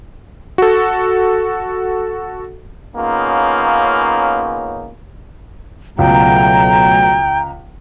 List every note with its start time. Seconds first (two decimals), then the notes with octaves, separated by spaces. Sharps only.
0.58 F#4 A4
2.97 C#3 A#3 B3 C#4 D#4 F4
5.99 C#2 B2 F#3 A3 G5 A#5